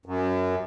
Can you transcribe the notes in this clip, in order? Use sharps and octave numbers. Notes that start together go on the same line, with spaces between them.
F#2